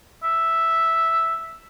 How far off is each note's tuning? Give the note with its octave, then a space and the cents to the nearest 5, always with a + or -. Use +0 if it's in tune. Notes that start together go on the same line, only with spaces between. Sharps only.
E5 +0